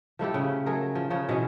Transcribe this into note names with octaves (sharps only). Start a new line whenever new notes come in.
F3 A3 E4 G4
C#3
F#3 A3 G#4 A#4
F3
C#3 F3 C#5
B2 E3 B3 C#4